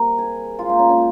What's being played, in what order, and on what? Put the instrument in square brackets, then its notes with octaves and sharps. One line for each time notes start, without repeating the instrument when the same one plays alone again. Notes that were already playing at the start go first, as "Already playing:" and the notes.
Already playing: [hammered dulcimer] C3 G3 A#3 A#4
G#4
A#2 G#3 F4
D#4
C#4
C#4